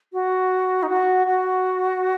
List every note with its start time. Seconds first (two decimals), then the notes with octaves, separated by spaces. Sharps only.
0.13 F#4
0.83 D#4
0.89 F#4
1.27 F#4